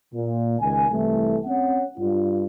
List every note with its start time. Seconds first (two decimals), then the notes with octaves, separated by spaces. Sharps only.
0.14 A#2
0.60 C#2 D#3 G#5
0.90 C2 E3 A3
1.45 C4 C#4 F#5
1.98 G2 F4